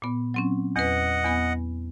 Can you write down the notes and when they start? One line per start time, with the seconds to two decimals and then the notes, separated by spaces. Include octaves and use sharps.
0.02 A#2 B3
0.34 F#3 C4 C#4
0.76 E2 B4 D#5 F#5
1.24 E2 B3 G#5